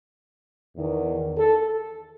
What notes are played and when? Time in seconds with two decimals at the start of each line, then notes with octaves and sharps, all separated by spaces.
0.77 E2 D#3
1.37 A4